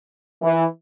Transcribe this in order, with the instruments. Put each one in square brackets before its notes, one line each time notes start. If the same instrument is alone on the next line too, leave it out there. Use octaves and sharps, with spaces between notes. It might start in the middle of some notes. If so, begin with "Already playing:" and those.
[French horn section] E3